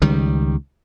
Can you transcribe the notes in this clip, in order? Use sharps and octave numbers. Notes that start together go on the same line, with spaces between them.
C#2 D#3 G3